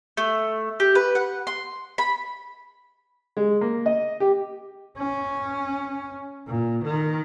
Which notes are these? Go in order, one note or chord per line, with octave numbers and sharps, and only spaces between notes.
A3
G4
B4
F#5
C6
B5
G#3
A#3
D#5
G4
C#4
A#2
D#3